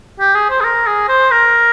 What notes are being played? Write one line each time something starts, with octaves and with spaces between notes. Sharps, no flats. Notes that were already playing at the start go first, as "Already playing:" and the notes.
G4
G#4
C5
G#4
A#4
G#4
C5
A#4